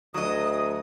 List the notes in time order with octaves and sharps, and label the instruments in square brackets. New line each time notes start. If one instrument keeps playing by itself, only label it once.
[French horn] D2 [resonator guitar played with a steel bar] F#3 D#5 [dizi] D#6